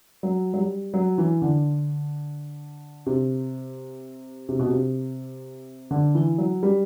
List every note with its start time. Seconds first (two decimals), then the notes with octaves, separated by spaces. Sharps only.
0.23 F#3
0.54 F#3
0.58 G3
0.94 F#3
1.18 E3
1.42 D3
3.06 C3
4.49 C3
4.59 B2
4.69 C3
5.91 D3
6.15 E3
6.38 F#3
6.63 G3